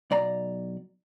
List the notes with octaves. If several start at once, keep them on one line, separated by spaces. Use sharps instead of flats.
B1 D5 A#5